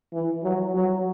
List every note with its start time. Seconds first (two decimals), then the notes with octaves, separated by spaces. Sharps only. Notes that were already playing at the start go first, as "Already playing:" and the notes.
0.13 E3
0.43 F#3
0.74 F#3